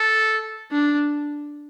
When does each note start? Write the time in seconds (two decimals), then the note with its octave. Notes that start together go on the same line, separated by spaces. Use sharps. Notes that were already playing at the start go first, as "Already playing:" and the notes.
Already playing: A4
0.72 D4